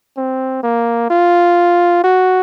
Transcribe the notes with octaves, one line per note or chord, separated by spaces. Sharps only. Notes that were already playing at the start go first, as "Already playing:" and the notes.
C4
A#3
F4
F#4